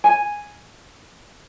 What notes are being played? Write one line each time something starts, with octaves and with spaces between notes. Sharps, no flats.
G#5